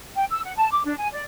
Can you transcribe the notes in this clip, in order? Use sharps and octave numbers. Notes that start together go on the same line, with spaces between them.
G5
E6
F#5
A5
D6
D4
G#5
D5